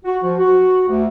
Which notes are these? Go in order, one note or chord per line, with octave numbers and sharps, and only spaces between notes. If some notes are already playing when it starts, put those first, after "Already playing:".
F#4
F3
F#4
D2